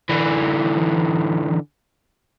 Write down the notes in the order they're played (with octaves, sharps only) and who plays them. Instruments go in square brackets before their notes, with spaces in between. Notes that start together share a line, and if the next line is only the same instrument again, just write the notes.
[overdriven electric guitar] D3 E3